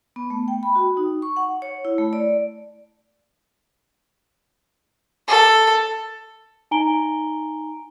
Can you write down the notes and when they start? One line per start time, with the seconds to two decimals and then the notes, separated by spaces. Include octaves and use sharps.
0.16 B3
0.30 A3
0.48 G5
0.63 B5
0.75 F#4
0.97 D#4
1.22 C#6
1.37 F#5
1.62 C#5
1.85 E4
1.98 A3
2.13 D5
5.28 A4
6.71 D#4 G#5 A#5 D7 G7